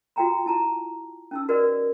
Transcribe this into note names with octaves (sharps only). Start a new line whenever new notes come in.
F4 F#4 A4 G5 A#5 B5
E4 A5 A#5
C#4 D#4 E6
F#4 A#4 B4 D5 D#5